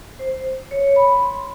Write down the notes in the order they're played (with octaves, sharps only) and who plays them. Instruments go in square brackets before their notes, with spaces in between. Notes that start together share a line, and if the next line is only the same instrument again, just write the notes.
[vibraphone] C5
C#5
B5
C6